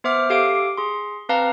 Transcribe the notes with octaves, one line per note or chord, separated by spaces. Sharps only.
B3 C5 E5 D6 F6
G4 A4 F5 D6 D7
G#4 C6
C4 B4 F5 A5 A#5